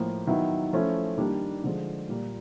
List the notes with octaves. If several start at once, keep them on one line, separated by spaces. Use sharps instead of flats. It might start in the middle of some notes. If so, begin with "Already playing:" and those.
Already playing: A2 F3 A#3
D#3 F#3 B3 E4
F3 A3 C#4 E4
D#3 G3 A#3 D4
D3 F3 G#3
A#2 G3 A#3